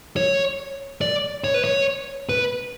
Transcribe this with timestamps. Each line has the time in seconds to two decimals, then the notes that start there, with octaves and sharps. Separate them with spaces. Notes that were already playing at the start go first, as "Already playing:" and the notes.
0.16 C#5
1.01 D5
1.44 C#5
1.54 B4
1.64 C#5
2.29 B4